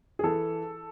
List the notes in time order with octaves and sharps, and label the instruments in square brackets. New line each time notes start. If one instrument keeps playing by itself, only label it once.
[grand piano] G#4
[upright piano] E3 [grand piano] A4